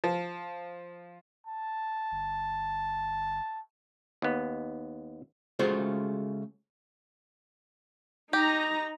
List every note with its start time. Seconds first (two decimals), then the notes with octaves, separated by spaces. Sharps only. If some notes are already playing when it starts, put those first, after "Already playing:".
0.04 F3
1.47 A5
2.12 G1
4.22 D#2 B3
5.59 C#3 G#3 A3 F4 F#4 C5
8.33 D#4 G4 A#5